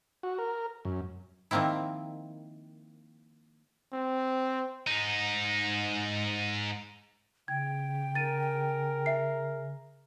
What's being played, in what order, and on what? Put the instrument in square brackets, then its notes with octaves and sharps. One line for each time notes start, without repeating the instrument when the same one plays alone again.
[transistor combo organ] F#4
A#4
F#2
[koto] D#3 F3 A#3 C4 E4
[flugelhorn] C4
[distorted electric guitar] G#2 D#4
[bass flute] C#3 [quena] G5 [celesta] G#6
[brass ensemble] G#4 A#4 [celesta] A6 D#7
[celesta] E5 C7